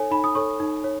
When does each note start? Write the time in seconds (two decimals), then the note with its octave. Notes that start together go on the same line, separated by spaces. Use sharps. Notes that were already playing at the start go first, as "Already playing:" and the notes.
Already playing: D#4 A4 C#5 G#5
0.11 D#4 B5
0.24 D#6
0.35 A4 C#5 C#6
0.60 D#4
0.84 C#5